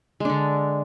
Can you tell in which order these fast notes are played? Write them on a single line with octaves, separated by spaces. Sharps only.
G#3 D4 D3